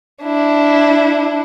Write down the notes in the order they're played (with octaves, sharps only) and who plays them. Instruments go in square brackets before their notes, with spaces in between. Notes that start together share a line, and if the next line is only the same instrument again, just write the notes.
[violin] D4 E4